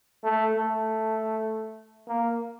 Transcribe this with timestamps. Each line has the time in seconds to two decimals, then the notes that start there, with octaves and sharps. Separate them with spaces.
0.23 A3
0.55 A3
2.07 A#3